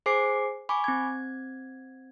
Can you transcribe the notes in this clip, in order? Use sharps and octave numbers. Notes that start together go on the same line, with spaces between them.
G#4 C5 G#5 D6 C7
G#5 B5 C#6 D6
C4 G#6